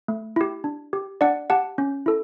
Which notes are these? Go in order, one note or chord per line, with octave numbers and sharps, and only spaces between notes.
A3
E4 G4
D4
G4
D4 D5 F#5
G4 F#5 A5
C#4
E4 A4